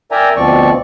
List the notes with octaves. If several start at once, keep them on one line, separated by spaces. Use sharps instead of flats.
A#4 D5 E5 G5 G#5 A#5
D2 B2 F3 C4 D5 C#6